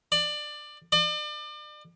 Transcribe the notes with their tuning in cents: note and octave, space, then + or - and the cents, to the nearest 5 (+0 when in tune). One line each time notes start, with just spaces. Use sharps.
D5 +20
D5 +35